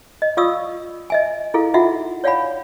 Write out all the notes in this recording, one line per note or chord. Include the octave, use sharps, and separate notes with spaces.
D#5
F4 D5 F5 C#6 D#6 E6
D#5 E5 G#5
E4 G#4 A4 F5
D#4 F4 F#4 E5 F#5
C#5 D5 F5 F#5 G#5 B5